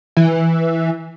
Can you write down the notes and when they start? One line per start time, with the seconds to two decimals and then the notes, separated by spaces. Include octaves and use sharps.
0.17 E3